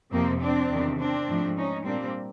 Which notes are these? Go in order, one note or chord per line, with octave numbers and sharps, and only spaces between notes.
F2 C3 F3 A#3 C4
C4 D4
E2 C3 D#3
C4 D4
G#2 F3 A3
C#4 D#4
A#2 G3 A#3 C4 D4